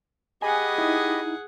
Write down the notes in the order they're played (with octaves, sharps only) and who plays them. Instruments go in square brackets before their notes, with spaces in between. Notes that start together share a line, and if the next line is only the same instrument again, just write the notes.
[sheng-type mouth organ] G4 D#5 B5 [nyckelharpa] G#4 F#5 [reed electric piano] G#5
[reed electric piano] D#4 E4